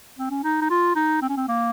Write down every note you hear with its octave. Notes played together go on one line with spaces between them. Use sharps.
C4
C#4
D#4
D#4
F4
D#4
C4
C#4
C4
A#3